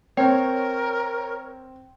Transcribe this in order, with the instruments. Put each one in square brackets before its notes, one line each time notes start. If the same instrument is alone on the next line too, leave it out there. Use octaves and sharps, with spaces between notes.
[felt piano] C4 [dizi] A#4 [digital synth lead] C#5 [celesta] G5